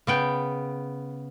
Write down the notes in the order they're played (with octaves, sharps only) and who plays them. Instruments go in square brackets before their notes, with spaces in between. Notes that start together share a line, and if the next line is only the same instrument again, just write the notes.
[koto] C#3 B3 G5